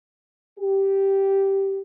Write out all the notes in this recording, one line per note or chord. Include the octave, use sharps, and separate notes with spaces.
G4